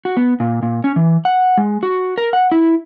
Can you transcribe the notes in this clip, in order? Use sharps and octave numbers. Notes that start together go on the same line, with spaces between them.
F#4
B3
A#2
A#2
C#4
E3
F#5
G#3
F#4
A#4
F#5
E4